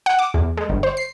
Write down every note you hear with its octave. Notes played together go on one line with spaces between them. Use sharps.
F#5
D6
E2
G#3
G1
C5
C7